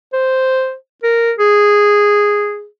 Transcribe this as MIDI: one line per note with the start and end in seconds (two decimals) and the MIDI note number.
0.13 0.74 72
1.03 1.32 70
1.39 2.66 68